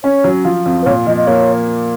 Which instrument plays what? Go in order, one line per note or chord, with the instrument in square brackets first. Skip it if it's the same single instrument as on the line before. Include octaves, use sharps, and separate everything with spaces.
[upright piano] C#4 [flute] C#5
[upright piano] F#3
F3
F2
[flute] B4
[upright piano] A#2 [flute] C#5
[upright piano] F3 [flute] D#5
[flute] D#5
[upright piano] A#3 [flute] C#5